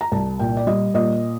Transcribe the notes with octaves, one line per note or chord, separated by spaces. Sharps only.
A#5
C2 A5
A#2 G5
D5
G3 D#5
A#2 D#5